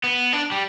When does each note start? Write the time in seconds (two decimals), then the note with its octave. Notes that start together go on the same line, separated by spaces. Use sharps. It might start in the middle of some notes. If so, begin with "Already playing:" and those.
0.04 B3
0.33 D4
0.51 G3